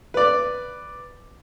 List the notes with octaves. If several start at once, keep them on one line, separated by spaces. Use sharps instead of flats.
B4 D5